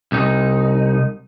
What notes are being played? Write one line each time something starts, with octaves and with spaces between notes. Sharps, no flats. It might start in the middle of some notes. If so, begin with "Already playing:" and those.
C2 D#4